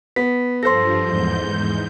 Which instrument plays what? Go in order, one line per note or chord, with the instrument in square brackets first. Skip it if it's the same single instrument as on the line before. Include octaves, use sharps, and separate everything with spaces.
[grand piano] B3 [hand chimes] B6
[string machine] G2 F3 [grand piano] A4 C5 [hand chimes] C6 A#6
[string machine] E2 G#2 G6